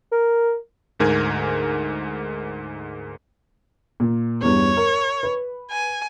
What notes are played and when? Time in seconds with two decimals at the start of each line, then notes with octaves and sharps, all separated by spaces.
0.12 A#4
1.00 D2 G#2 A#4 G#5 G#6
4.00 A#2
4.42 E2 G2 C#5
4.77 A#4
5.23 B4
5.71 G#5